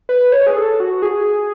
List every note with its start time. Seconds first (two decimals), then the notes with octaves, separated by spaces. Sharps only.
0.09 B4
0.32 C#5
0.46 G#4
0.56 A4
0.80 F#4
1.02 G#4